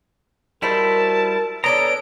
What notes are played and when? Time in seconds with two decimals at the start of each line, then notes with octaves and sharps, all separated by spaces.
0.62 G3 D#4 E4 F#4 A#4 C5 A5
1.64 B3 C#4 D4 A4 A#5 D7